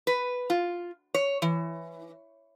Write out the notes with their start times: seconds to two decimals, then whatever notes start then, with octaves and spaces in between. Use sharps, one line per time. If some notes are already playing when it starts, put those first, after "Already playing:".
0.07 B4
0.50 F4
1.14 C#5
1.42 E3